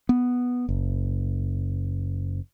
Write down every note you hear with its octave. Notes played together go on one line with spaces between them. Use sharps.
B3
F#1